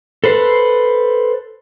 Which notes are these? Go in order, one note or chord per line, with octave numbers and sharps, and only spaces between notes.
A4 B4 C5